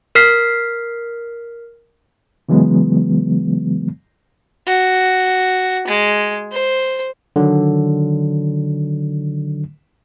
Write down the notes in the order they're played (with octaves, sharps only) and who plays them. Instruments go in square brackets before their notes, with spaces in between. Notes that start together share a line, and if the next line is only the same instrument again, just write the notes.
[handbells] A#4 F6 B6 C7
[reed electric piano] C#3 E3 F#3 G#3 B3
[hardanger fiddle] F#4
G#3
C5
[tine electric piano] D3 D#3 F#3